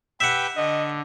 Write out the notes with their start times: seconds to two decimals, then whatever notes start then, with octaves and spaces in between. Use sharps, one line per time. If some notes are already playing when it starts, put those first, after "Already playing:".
0.20 G4 B4 E5 F#5 G5
0.56 D3 D#5